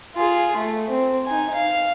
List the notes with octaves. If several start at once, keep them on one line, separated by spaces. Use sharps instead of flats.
F4 G#4
A3
C4
D#4 G#5
F5